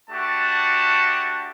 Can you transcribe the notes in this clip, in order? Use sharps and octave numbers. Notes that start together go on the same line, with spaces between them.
A3 D4 F#4 G4 A5